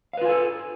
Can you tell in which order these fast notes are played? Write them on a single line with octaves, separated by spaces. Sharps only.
F5 B4 F4 G#5 A4